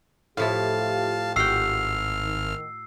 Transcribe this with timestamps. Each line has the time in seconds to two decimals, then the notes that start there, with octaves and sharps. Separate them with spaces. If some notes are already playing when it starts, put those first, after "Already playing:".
0.37 A2 F3 A3 E4 F4 G4 F5 A5
1.36 G#1 F#4 G5 E6 F6 C7
2.23 D#3